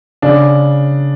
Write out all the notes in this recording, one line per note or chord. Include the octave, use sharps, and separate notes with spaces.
C#3 D4